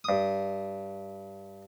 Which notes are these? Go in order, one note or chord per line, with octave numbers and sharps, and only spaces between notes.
G2 D#6